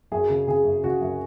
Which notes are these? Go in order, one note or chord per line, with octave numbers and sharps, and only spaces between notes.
F#2 G#4
C#3
C#3 G#4
F#2
C#3 F#4
F#2